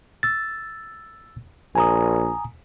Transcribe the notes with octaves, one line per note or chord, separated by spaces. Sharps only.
E6 A6
A#1 G#5 A#5 D#6